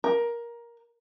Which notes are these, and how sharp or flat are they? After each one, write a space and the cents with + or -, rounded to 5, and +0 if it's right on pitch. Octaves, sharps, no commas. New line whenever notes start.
A#4 +15